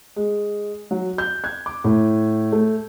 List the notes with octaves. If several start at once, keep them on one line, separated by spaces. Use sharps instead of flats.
G#3
F#3
G6
G#6
D6
A2
A3